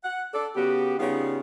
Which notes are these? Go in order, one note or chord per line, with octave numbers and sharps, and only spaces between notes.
F#5
A4 D5
C#3 B3 F#4 G4
C#3 G3 B3 D#4 F4